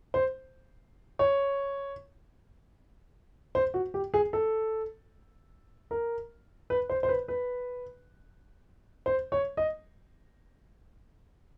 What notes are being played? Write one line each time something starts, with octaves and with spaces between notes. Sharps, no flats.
C5
C#5
C5
F#4
G4
G#4
A4
A#4
B4
C5
C5
B4
B4
C5
C#5
D#5